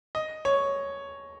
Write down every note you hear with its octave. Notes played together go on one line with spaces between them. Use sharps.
D#5
C#5